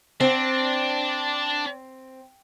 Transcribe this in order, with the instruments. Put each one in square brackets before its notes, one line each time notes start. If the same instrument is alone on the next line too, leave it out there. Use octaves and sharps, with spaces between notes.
[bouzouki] C4 [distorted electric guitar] D4